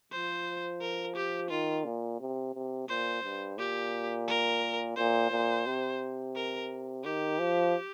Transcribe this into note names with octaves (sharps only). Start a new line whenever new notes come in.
F3 C5
A#4
G4
D#3 F4
A#2
C3
C3
A#2 C5
G2
A#2 G4
A#4
A#2 C5
A#2
C3
A#4
D#3 G4
F3